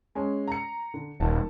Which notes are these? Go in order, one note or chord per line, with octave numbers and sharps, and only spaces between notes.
G#3 C#4
A#5 C#7
D3
D#1 D#3 A5